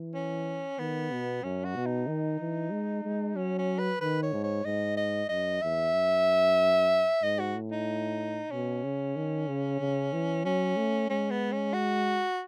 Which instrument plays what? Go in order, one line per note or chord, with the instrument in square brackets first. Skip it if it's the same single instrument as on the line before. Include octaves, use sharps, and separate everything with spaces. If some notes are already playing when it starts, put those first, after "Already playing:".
Already playing: [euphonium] E3
[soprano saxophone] C#4
[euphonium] D#3 [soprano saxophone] B3
[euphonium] B2
[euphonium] F#2 [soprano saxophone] C#4
[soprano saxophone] F#4
[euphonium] B2
[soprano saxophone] D#4
[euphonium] D#3
E3
G#3
G#3
[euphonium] F#3 [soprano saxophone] C#4
[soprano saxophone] C#4
B4
[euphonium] D#3 [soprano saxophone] B4
[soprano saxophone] C#5
[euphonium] G#2
[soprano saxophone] C#5
[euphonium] G#2 [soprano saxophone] D#5
[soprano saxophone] D#5
[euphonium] F#2 [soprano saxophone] D#5
[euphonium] E2 [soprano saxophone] E5
[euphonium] F#2
[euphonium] G#2 [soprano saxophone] D#5
[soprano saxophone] F#4
[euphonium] A2
[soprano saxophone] D#4
[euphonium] B2 [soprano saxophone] C#4
[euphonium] C#3
D#3
C#3
C#3
E3
[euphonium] F#3 [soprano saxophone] C#4
[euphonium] A3
[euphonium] G#3 [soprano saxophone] C#4
[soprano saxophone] B3
C#4
F#4